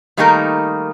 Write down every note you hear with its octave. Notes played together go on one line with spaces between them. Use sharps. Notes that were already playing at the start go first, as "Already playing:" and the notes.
D#3 G3 A3 A#3 D#4 A#4